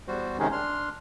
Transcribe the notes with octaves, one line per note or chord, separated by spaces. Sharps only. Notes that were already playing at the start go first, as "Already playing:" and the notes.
E2 G3 F#4 C5
C3 D#3 G#3 C#4 D#4 G#4
D4 C6 F6